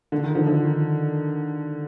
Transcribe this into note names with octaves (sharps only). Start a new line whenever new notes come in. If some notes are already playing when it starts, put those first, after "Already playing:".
D3
D#3
D3 F3
D3 F3
D#3